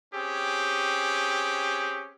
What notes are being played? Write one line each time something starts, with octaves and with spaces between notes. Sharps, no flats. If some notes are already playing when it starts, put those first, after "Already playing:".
C4 C#4 G4 G#4